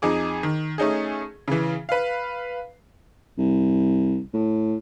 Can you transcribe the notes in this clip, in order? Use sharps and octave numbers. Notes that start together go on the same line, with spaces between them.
F2 D#4 G#4 D6
D#3
A3 C#4 D#4 G#4
C#3 E3
B4 F5
C2
A2